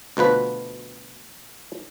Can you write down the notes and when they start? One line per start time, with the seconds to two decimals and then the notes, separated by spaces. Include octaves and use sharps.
0.17 D2 B2 F3 B4